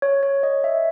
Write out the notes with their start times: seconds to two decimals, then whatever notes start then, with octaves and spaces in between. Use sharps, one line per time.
0.02 C#5
0.23 C#5
0.43 D#5
0.64 E5